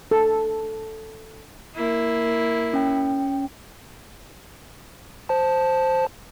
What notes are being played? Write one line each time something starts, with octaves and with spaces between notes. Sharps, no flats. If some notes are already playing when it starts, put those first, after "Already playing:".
A4
A#3 E4
C#4 G5
C5 A5